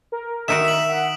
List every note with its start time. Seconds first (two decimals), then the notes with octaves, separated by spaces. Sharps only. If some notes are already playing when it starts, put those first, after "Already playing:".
0.12 A#4
0.48 D#3 D#4 F#4 E5 D#6 D7 E7
0.65 B6 F#7
0.89 F#5